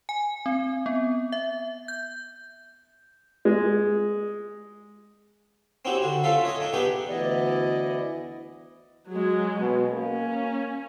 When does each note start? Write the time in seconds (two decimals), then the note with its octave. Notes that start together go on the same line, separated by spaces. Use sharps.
0.09 G#5
0.46 C4
0.86 B3
1.32 E5
1.88 G6
3.45 G#3
5.85 C4 C#4 D#4 E4 F#4 G4
6.02 D3 F#4
6.23 A3 C#4 F4 A4 E5 F5
6.45 C#5 D#5 G#5
6.60 A3 D4 D#4
6.73 B3 D4 D#4 G4 G#4 B4
7.09 D2 E3 B3 E4 D5 D#5
9.08 F#3 G#3
9.60 B2
9.91 A#3 C#4